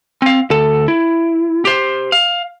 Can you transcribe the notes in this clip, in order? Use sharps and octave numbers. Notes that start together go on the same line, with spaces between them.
C4 F5
D2 A4
E4
G4 C5
F5